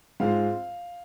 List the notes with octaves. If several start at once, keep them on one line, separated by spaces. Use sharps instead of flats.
G#2 G#3 C4 F4 F5